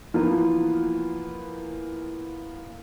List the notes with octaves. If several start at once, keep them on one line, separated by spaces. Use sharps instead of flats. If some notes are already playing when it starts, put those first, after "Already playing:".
E3 F3 A#3 B3 F4